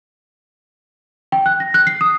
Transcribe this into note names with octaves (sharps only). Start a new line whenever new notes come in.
G5
F#6
A#6
F#6
C7
D#6